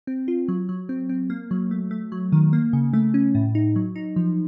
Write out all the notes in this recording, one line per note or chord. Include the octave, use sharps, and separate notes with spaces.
C4
F4
F#3
F#3
C4
C4
A#3
F#3
A3
A3
F#3
D#3
A#3
C#3
A3
C#4
A2
D#4
F#3
D#4
F3